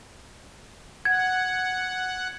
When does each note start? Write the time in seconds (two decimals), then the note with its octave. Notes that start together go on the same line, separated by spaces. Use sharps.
1.05 F#5 G#6